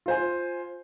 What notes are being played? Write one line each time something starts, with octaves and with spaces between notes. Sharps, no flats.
F4 C5 G#5